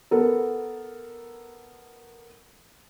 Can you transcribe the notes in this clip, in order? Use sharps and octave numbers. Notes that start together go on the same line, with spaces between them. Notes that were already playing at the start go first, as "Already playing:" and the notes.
B3 A4 A#4